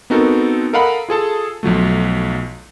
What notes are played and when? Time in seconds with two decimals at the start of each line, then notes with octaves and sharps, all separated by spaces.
0.10 B3 C4 D#4 F#4 A4 A#4
0.73 A4 A#4 D#5 F5 F#5 B5
1.09 F4 G#4 A4 A5
1.63 B1 F3 F#3 A3